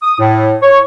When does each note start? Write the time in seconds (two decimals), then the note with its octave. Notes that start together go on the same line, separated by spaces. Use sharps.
0.01 D#6
0.19 A2
0.62 C#5